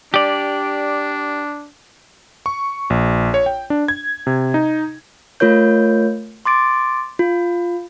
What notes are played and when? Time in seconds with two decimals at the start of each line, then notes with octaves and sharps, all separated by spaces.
0.14 D4 G4 D5
2.46 C#6
2.90 A#1
3.34 C#5
3.46 G5
3.70 D4
3.88 G#6
4.27 C3
4.54 D#4
5.40 A3 F4 A#4 C#5 G6
6.45 C6 D6 A6 D7
7.19 F4